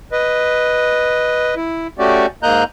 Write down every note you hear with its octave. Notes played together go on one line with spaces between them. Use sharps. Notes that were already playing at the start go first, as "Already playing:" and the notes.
B4 D#5
E4
A3 C#4 F#4 G4 D5
G#2 A#3 D#5 A#5 F#6 G6